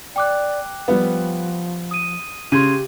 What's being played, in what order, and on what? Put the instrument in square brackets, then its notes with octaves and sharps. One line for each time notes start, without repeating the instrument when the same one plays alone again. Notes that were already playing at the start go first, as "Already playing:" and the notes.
[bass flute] D5 [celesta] G5 D6 F#6
[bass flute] F3 [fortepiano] G3 B3
[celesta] D#6 D#7
[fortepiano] C#3 [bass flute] G4 [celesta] C6 G#6 D#7